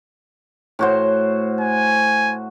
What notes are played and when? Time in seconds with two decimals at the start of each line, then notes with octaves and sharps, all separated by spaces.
0.79 A2 F#4 C5
1.61 G#5